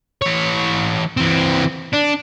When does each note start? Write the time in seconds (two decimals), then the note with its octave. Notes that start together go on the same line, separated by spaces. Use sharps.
0.22 E3 C#5
1.17 E3 C4
1.93 D4